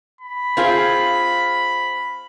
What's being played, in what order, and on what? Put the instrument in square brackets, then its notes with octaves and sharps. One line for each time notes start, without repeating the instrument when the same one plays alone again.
[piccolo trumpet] B5
[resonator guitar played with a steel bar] C4 F4 G#4